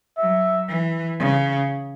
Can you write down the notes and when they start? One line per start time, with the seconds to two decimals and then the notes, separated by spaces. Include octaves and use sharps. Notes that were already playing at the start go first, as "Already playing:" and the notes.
0.18 F#3 E5
0.68 E3
1.19 C#3